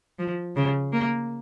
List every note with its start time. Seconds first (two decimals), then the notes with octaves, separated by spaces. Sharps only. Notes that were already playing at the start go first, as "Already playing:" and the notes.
0.19 F3
0.56 C#3
0.93 A#3